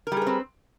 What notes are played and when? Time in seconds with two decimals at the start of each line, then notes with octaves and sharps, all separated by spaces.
0.07 A#4
0.12 G3
0.17 G#4
0.22 B4
0.26 C4